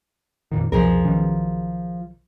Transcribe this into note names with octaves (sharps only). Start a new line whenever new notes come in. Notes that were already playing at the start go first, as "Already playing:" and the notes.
F2 A#2 D#3
C2 F2 B2 F3 G#4 A#4
B1 D#3 C#4